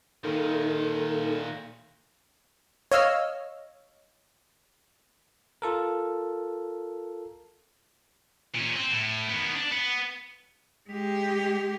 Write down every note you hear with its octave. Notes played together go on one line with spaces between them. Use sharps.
A#2 D#3 D#4 A4 A#4
C#5 D#5 F5 E6 F6
F4 A4 A#4
A#2 C#4
C4
A2
D#3 B3
D4
B3
G#3 G4